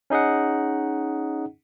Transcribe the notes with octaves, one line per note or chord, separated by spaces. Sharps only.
C#4 D#4 G#4 D#5 F#5